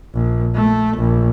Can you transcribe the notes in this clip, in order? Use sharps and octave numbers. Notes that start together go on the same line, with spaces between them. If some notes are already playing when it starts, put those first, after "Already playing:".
A#1
A3
A#1